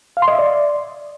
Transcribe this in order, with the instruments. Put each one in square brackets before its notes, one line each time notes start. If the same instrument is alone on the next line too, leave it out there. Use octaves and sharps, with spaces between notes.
[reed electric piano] F5
C6
D#5
E5
D5